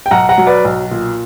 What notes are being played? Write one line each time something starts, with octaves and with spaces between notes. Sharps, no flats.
G5
B1 F#5 A#5
F#5 A#5
F#3
B4 D5
B1
A#2